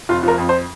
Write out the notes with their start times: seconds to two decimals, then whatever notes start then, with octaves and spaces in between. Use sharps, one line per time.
0.09 F1 F4
0.23 F3 A#4
0.38 F2
0.49 C5